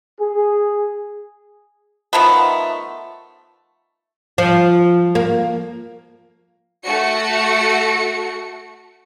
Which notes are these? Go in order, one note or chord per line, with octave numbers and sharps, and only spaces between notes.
G#4
D#3 F3 A3 B3
F3
A#3
A3 F#4 C#7